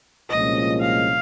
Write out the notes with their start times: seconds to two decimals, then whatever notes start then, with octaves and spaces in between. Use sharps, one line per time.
0.29 C2 A#2 F3 G#3 C#4 D#5
0.81 F5